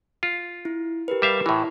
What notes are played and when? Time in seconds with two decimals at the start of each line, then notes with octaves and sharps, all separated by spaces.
0.23 F4
0.65 E4
1.08 G4 A#4 B4
1.22 G3 E5 F5
1.46 A2 E3 E4